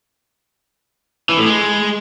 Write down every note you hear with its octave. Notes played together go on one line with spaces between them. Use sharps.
E3
A2
G#3